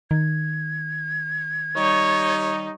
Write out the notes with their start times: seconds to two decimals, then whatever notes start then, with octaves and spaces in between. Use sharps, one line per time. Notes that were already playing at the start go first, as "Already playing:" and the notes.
0.11 D#3 G#6
1.77 G3 D#4 C#5